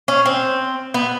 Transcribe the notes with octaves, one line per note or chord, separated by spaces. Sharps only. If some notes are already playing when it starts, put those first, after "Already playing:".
C#4
C4
B3